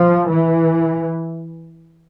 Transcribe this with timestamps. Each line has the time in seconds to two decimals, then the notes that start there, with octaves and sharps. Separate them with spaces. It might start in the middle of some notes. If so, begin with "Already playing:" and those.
Already playing: F3
0.31 E3